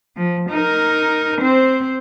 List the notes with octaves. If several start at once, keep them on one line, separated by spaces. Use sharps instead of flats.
F3
D#4 A#4
C4 C5